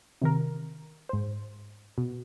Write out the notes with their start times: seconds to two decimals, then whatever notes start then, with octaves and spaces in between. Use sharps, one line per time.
0.22 C3 D#3 A#4
1.09 G#2 C5
1.98 B2